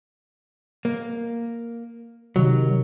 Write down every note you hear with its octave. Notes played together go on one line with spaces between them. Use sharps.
A#3
C3 D#3 F#3